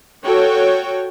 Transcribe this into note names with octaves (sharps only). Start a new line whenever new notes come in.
F#4 A4 C#5 G5